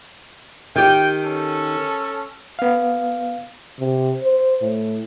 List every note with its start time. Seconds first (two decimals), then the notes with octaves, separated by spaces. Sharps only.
0.76 D#3 G4 G5
1.24 C#4 A4
2.59 B3 F5
3.79 C3
4.23 C5
4.62 A2